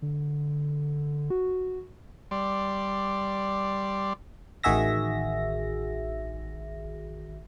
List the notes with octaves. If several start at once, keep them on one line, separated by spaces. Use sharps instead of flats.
D3
F#4
G3 D5 C6
A1 D#3 F#4 G#4 E5 A#6